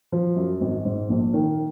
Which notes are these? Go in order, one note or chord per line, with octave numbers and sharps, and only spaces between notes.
F3
F#2
G#1
G#2
A#1
D#3